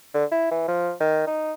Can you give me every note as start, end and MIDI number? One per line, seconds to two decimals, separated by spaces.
0.14 0.25 50
0.32 0.48 64
0.51 0.66 52
0.68 0.92 53
1.00 1.23 51
1.27 1.53 63